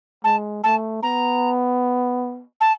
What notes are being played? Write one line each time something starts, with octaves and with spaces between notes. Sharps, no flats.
G#3 A5
A3 A5
B3 A#5
A5